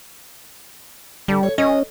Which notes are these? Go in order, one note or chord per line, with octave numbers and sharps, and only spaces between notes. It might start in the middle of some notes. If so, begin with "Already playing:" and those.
D3 G3
C#5
C#4 D#5